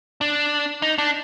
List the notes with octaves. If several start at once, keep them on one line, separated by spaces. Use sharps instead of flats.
D4
D#4
D4